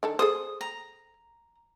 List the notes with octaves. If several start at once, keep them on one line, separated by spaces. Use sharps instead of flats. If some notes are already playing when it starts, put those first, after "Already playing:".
D#3 D4 A4
G#4 A4 C5 D#6
A#5